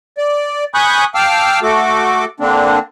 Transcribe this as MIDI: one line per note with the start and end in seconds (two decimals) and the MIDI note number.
0.18 0.64 74
0.74 1.04 80
0.74 1.04 83
0.74 1.04 85
0.74 1.04 87
0.74 1.04 90
0.74 1.04 91
1.15 1.59 77
1.15 1.59 79
1.15 1.59 81
1.15 1.59 86
1.15 1.59 88
1.15 1.59 89
1.63 2.25 57
1.63 2.25 66
1.63 2.25 69
1.63 2.25 86
2.40 2.79 50
2.40 2.79 58
2.40 2.79 60
2.40 2.79 62